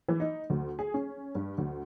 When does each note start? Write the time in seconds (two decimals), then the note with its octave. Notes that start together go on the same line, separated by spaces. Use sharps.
0.08 E3
0.20 D#4
0.50 D2
0.79 G#4
0.94 C#4
1.35 G2
1.58 D2